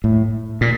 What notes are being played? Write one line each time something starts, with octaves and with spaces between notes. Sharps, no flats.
A2
A#2